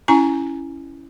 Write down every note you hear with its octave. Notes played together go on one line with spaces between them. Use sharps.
C#4 E4 G#5 A#5